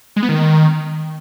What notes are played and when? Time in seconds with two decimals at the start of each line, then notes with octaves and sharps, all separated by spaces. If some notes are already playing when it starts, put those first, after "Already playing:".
0.16 G#3
0.23 B3
0.29 D#3